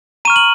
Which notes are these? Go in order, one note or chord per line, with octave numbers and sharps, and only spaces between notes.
A#5 C#6 F6 D#7
F#7